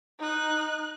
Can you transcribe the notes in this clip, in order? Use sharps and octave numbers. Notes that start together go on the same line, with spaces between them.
D#4 F#6